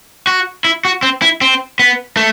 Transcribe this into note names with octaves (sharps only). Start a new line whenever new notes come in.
F#4
E4
F#4
C4
E4
C4
B3
A3